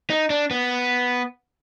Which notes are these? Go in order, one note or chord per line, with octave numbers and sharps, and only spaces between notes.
D#4
D4
B3